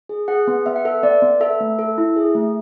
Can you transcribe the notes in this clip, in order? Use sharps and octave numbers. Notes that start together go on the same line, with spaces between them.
G#4
G#4 F#5
B3
B3 E5
F#5
A4 E5
B3 D5
B3
A4 E5
A3
A4
E4
G#4
A3